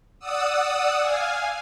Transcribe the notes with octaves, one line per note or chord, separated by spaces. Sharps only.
D5 F#5 D#6 E6
F5 G#5